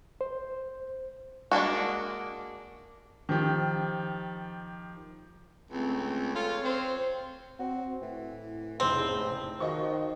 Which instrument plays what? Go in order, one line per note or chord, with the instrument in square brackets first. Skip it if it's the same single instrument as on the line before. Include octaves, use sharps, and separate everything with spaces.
[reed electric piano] C5
[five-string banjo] G#3 A#3 D4 F#4
[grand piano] D#3 F3 G4
[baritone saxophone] C#2 [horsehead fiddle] A3 C4
[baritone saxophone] F4 [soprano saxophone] A4 [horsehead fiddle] C#5
[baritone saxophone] C4 [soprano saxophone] C5
[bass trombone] C4 [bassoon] F#4
[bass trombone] A2 [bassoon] E3
[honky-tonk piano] F1 C#3 C5 [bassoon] G#2 [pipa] C4
[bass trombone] D#3 [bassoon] F3 [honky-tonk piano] F#4 D#5 C#6